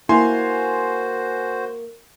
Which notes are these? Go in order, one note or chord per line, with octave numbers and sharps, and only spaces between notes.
A#3 E4 F#4 C5 G#5 C6